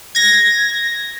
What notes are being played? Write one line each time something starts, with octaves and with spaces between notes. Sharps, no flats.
G#6 A#6